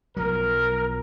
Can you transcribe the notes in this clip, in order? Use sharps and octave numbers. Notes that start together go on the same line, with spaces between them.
B1 F3 F#3 A#4